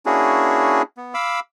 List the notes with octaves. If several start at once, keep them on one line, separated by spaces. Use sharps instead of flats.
A#3 C#4 D4 E4 F#4 G#4
B3
F5 B5 D6 E6